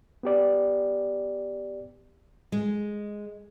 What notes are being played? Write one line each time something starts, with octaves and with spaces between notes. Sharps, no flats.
B3 G4 D5
G#3